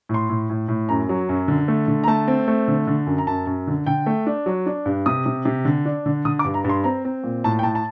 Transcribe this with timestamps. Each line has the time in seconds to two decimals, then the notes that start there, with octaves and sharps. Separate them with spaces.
0.09 A2 C6
0.30 A2
0.50 A2
0.68 A2
0.89 F#2 A#5
1.09 F#3
1.29 F#2
1.48 D3
1.68 A3
1.88 D3
2.04 A#5
2.08 A3 A5
2.28 C4
2.48 A3
2.68 D3
2.87 D3
3.07 F#2
3.18 A#5
3.27 F#2 A5
3.47 F#2
3.67 D3
3.86 D3 G5
4.06 A3
4.27 D4
4.46 F#3
4.66 D4
4.86 G2
5.06 C3 D#6
5.26 C3
5.45 C3
5.65 D3
5.85 D4
6.06 D3
6.25 D3 D#6
6.39 D6
6.45 G2
6.54 A#5
6.64 G2
6.69 C6
6.84 C4 A#5
7.05 C4
7.24 A#2
7.44 A2 A5
7.59 G5
7.63 A2 A5
7.75 A5